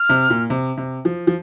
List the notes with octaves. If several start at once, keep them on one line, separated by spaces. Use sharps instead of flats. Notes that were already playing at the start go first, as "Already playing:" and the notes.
Already playing: F6
C3
A#2
C3
C3
F3
F3